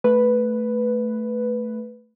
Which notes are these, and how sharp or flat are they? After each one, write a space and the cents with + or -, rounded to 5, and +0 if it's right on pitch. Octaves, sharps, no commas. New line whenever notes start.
A3 +0 B4 +0